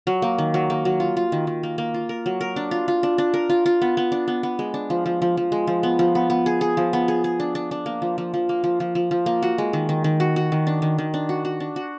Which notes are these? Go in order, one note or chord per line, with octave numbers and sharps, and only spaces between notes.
F#3
A#3
D#3
F#3
A#3
F#3
F4
F4
D#3
D#3
A#3
A#3
F4
A#4
F#3
A#4
D4
F4
F4
D4
D4
A#4
F4
F4
B3
B3
D4
B3
B3
G#3
D4
F3
F3
F3
F3
G#3
F3
B3
F3
B3
B3
G#4
G#4
F3
B3
G#4
G#4
D4
D4
D4
A#3
F3
F3
F3
A#3
F3
F3
F3
F3
A#3
F#4
G#3
D#3
D#3
D#3
F#4
F#4
D#3
D4
D#3
D#3
D4
F#4
F#4
D4
F#4